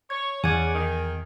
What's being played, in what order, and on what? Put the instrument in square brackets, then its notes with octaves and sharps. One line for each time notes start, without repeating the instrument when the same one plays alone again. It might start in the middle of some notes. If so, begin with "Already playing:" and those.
[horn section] C#5 [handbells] G#6
[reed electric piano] E2 [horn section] C#3 D5 F#5 [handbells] G#5 G#6
[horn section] D#3